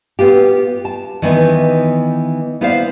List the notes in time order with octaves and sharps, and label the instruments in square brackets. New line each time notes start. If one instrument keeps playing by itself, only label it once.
[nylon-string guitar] B3 F4 G4
A5
D#3 E3 B3 D#4
B3 E4 C5 D5 F5